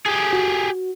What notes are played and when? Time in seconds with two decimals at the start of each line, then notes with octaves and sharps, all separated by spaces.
0.06 G4 G#4
0.33 F#4